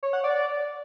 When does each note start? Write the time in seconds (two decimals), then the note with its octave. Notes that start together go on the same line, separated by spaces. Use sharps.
0.03 C#5
0.13 F#5
0.24 D5